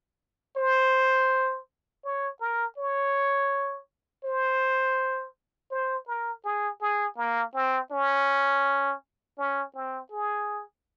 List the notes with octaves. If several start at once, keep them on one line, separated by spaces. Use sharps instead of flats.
C5
C#5
A#4
C#5
C5
C5
A#4
G#4
G#4
A#3
C4
C#4
C#4
C4
G#4